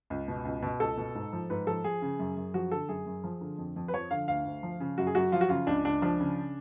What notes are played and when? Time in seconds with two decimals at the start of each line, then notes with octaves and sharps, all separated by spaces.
0.10 C#2
0.28 B2
0.45 C#2
0.62 B2
0.80 C#2 A4
0.97 B2
1.15 G#2
1.33 F3
1.50 G#2 B4
1.67 F3 A4
1.84 F3 G#4
2.02 C#3
2.19 F#2
2.37 F#2
2.54 F3 F#4
2.71 D3 A4
2.89 F#2 G#4
3.06 F#2
3.24 F3
3.41 D3
3.58 F2
3.76 F2
3.88 B4
3.93 F3 C#5
4.11 D3 F5
4.28 D2 F5
4.45 D2
4.63 F3
4.80 C#3
4.98 F#2 F#4
5.07 G#4
5.15 F#2 F#4
5.32 F3 F4
5.41 F#4
5.49 C#3 F4
5.67 C#2 D4
5.85 C#2 D4
6.02 F3 D4
6.20 C#3